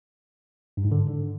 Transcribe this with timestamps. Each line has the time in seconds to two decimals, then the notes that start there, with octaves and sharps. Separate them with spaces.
0.77 G2
0.84 G#2
0.92 D3